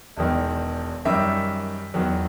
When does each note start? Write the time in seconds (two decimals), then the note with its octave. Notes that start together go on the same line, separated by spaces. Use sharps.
0.17 E1 E2 D#3
1.05 F#2 D#3 G3 E5
1.94 E2 D#3 F#3